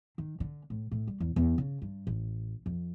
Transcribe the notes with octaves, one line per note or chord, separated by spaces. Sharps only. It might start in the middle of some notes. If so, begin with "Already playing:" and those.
D#3
D3
A2
A2
G3
E2
E2
C#3
G2
A1
F2